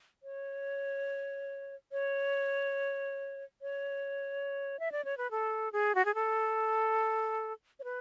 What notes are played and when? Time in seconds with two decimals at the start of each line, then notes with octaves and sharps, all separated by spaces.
0.23 C#5
1.92 C#5
3.62 C#5
4.80 E5
4.92 D5
5.05 C#5
5.18 B4
5.31 A4
5.73 G#4
5.95 F#4
6.05 G#4
6.15 A4
7.80 C#5
7.84 B4